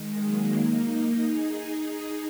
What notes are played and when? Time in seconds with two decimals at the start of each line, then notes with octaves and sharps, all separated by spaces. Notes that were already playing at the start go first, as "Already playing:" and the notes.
Already playing: D#3 G#3
0.23 F#3 A#3
0.56 A#3 D#4
0.89 A#3 D#4
1.22 D#4 G#4
1.56 D#4 G#4